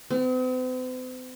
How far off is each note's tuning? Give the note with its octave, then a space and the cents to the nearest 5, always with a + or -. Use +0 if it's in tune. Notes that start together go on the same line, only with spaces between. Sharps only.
C4 -45